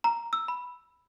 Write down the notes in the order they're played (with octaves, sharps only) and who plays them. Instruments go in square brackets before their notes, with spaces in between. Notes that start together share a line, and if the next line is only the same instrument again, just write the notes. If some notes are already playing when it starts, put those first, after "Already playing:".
[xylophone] A#5
E6
B5